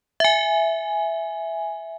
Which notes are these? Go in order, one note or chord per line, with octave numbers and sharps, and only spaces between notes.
E5 G#5